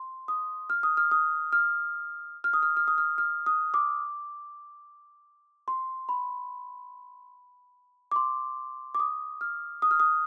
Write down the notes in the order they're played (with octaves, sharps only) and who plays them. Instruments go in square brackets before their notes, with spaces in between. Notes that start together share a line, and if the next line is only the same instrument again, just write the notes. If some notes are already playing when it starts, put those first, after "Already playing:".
Already playing: [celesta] C6
D#6
F6
D#6
F6
D#6
F6
F6
D#6
F6
F6
D#6
F6
F6
D#6
D6
C6
B5
D6
C6
D6
D#6
F6
D#6
F6
D#6